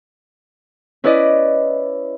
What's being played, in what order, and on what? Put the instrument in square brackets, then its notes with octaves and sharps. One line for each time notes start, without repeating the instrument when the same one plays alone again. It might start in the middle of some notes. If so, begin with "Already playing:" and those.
[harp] C#4 E4 B4 D5 D#5